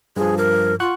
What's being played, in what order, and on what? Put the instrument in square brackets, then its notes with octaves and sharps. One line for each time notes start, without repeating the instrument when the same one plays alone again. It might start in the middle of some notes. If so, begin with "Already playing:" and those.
[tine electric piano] G2 F3 [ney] G#4
[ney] A#4
[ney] F4 [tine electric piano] F#5 C#6 F#6